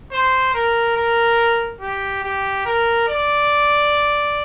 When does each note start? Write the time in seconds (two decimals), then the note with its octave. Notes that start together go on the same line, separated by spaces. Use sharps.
0.12 C5
0.54 A#4
0.96 A#4
1.81 G4
2.23 G4
2.65 A#4
3.08 D5